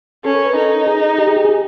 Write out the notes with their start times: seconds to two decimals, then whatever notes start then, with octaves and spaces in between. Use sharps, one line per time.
0.24 C#4 A4
0.35 A#4
0.45 B4
0.56 D#4 A4
0.87 G#4
1.18 G4
1.27 G#4
1.37 G4
1.45 G#4
1.49 G4